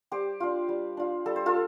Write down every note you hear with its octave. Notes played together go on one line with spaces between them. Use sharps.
G3 G4 C5
D4 F4
G3
D4 F4
G3 A4
C5
F4 A4